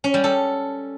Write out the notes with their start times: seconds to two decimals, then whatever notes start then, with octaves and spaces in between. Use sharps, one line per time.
0.04 C#4
0.14 G3
0.24 A4